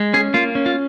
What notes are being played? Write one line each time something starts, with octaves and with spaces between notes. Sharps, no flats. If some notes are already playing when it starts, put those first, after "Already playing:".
Already playing: G#3
C#4 G#4
A#3 F4
C#4
F4